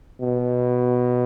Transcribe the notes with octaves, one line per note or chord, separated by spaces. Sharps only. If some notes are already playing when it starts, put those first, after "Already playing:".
B2